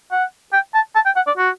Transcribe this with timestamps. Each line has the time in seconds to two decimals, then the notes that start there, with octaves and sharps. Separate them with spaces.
0.11 F#5
0.53 G5
0.74 A5
0.95 A5
1.06 G5
1.16 F#5
1.27 D5
1.37 F#4